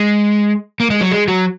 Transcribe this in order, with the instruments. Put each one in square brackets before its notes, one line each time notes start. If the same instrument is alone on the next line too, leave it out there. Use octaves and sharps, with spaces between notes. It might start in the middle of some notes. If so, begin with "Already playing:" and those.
Already playing: [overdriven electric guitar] G#3
A#3
G#3
F#3
G#3
F#3